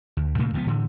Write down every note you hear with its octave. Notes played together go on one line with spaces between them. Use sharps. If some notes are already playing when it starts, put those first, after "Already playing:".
D2
A#2 C#3 A3 A#3
C#2 F3 F#3 B3
A2 D3 E3